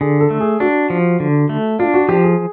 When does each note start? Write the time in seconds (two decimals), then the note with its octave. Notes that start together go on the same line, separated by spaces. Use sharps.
0.01 D3 G#4
0.20 A4
0.30 A3
0.40 G#4
0.60 D4 F#4
0.90 F3
1.20 D3
1.49 A3
1.79 D4 F4
1.94 F#4
2.09 F3 G4
2.24 G#4